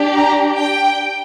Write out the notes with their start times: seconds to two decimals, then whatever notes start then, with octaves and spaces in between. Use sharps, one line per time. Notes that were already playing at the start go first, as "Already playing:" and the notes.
Already playing: D4 G4
0.16 A#5
0.55 G5